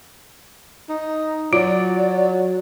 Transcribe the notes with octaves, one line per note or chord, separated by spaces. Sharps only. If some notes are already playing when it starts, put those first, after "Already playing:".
D#4
F#3 F4 D5